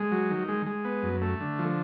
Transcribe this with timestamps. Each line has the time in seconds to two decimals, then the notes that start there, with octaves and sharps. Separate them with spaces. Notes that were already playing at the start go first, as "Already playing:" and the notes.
Already playing: G#3
0.12 F#3
0.30 D#3
0.49 G#3
0.66 G#3
0.85 B3
1.03 F#2
1.22 A3
1.41 D3
1.59 F3